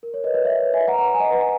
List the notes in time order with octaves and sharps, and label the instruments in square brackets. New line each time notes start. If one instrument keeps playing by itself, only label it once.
[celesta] A#4
C#5
B4 D#5
B4 D#5
C#5 E5
E5 G#5
F#5 A#5
F#5 A#5
G#5
D#5 F#5
B4